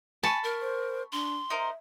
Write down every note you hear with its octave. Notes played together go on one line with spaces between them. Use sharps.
G#5 A5 B5 C#6
A#4
C5
D4 C6
D#4 A#4 C5 E5